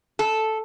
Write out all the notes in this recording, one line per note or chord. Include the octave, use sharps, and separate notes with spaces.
A4